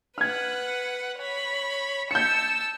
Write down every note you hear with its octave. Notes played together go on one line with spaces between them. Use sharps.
B4 F#5 F6 G#6
C#5 B5
A5 E6 G6 C#7